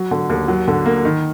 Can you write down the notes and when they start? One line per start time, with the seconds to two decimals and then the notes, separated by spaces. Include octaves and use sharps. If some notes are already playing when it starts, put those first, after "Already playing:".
Already playing: F#3
0.11 D3
0.30 D#2
0.48 F#3
0.68 D3
0.86 A#3
1.05 D#3